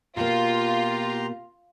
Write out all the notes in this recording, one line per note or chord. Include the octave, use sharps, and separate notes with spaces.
B2 A#3 F4 G4 A#5 C6